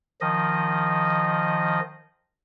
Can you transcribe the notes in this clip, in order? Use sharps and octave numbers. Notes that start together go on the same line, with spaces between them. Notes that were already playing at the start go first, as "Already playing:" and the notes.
D#3 F3 D#5